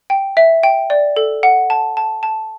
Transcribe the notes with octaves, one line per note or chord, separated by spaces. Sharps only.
G5
E5
G5
D5
A4
F#5
A5
A5
A5